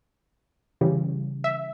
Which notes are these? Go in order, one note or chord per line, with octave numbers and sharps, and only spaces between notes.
C#3 E3 G3
E5